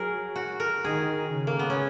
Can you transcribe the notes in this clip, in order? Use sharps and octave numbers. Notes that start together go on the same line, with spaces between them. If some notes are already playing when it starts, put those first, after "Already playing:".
Already playing: F#3 G#4 A#4
F#4
A#4
D#3 G#4
C#3
A#3
B3
C#4